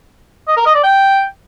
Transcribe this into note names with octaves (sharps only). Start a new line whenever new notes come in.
D#5
A#4
D#5
D5
G5